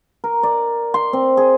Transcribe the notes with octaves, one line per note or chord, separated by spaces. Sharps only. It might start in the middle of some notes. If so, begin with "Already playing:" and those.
A#4
D5
C6
C4
G#4